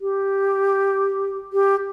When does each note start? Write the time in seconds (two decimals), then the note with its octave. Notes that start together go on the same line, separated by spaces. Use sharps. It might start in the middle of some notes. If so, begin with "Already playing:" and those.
0.01 G4
1.53 G4